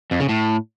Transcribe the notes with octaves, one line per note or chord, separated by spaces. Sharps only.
F2
C#3
A2